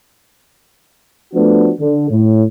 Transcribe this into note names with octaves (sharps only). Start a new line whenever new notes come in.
F3 A3 B3 D4 F#4
D3
A2